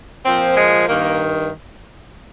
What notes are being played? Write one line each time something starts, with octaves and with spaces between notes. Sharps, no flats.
A#2 F3 C4
G#3
G2 D#3 A#3